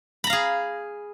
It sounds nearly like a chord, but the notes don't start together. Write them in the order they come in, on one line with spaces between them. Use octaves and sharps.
B5 A#5 F5 G#4